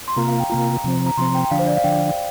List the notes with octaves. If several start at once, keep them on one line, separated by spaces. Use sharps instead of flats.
C6
C3 A#3 F4 A#5
F5
G5
C3 A#3 F4 A#5
C3 F3 C4
A#5
C3 F3 C4 C6
G5
G5
D3 F3 D4 F5
C5
D5
F5
D3 F3 D4 G5